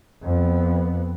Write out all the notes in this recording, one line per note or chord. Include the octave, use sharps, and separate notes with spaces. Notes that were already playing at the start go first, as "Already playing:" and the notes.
F2 B3